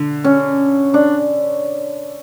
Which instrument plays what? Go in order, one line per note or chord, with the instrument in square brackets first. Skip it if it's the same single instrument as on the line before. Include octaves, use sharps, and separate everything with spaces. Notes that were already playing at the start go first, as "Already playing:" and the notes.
Already playing: [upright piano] D3
[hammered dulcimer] C#4
D4